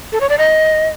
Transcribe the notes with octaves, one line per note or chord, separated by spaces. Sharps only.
A4
C#5
D5
D#5